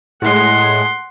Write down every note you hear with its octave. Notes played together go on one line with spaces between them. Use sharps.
A2 G#3 F#5 C6